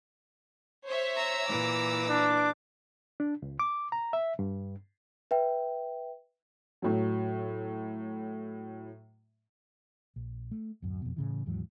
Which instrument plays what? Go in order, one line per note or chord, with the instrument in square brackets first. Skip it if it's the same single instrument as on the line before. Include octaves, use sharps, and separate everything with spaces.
[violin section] C5 C#5 E5
[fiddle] A#5 E6
[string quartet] A#2 E3 [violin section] D6
[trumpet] D4
[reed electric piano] D4
C#2
D6
A#5
E5
G2
[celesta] B4 E5 G5
[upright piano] A2 F#3
[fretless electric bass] A#1
A3
D1 F#2
F2 B2
A2 C#3 E3
D#2 G#2 E3 F#3